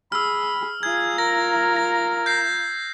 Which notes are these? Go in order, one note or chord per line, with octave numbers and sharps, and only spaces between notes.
G#4 B5 E6 F6
F4 G#4 A#5 G#6
A#4 A#6
A#6
G6 A#6 C7